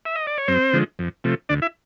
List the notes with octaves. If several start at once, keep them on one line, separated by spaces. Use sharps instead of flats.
E5
D#5
D5
C#5
F#2 C4 C5
D3 F3 G#3
F2
C3 F3 A3
D2 D4 D5
E4 E5